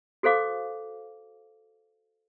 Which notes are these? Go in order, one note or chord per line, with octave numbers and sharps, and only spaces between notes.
F#4 A4 C5 F5 D6